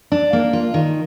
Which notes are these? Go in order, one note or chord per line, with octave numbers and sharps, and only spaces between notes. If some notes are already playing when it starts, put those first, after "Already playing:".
D4
A#3
F4
D#3